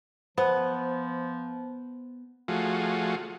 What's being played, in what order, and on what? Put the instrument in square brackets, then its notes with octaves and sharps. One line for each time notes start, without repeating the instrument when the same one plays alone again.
[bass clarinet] F3 [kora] B3 [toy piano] C5
[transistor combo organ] F3 A3 F4 F#4 G#4